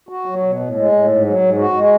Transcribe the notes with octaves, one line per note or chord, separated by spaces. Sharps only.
F#4
F#3
B2
A2
G#3
A2
G#2
F#3
G#2
F#4
G#3